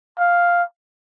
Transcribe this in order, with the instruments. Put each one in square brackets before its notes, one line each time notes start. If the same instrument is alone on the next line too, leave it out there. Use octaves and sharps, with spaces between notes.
[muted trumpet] F5